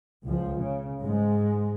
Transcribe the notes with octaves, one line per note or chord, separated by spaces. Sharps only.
C#2 F3
C#3
G#2 G#3